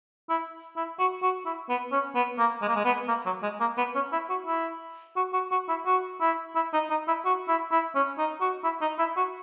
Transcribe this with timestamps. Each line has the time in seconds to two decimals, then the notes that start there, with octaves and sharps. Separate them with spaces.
0.29 E4
0.77 E4
0.99 F#4
1.22 F#4
1.46 E4
1.69 B3
1.92 C#4
2.15 B3
2.38 A#3
2.62 G#3
2.68 A#3
2.76 G#3
2.85 B3
3.08 A#3
3.25 F#3
3.43 G#3
3.60 A#3
3.77 B3
3.95 C#4
4.12 E4
4.30 F#4
4.47 E4
5.16 F#4
5.33 F#4
5.52 F#4
5.69 E4
5.86 F#4
6.20 E4
6.55 E4
6.73 D#4
6.90 D#4
7.07 E4
7.25 F#4
7.49 E4
7.72 E4
7.95 C#4
8.18 D#4
8.41 F#4
8.64 E4
8.81 D#4
8.99 E4
9.17 F#4